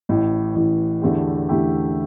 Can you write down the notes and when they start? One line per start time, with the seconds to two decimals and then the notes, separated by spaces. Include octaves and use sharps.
0.09 A1 A2 E3
0.55 A1 A2 E3
1.02 E2 D3 A3 E4 G4
1.49 E2 D3 A3 E4 G4